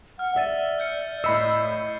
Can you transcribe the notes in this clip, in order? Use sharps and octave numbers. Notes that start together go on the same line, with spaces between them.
F#5 F6
D5 E5 E6 A6 D#7
F6 G6 C#7
A2 D#5 B5 E6 C7 C#7